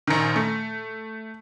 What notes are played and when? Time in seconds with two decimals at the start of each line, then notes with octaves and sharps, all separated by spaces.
0.07 A#1 D#3
0.36 A3